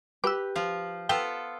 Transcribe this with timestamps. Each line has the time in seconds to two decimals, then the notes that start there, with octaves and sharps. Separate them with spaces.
0.24 G4 B4 D6 E6
0.56 F3 F4
1.09 B3 F4 A4 G5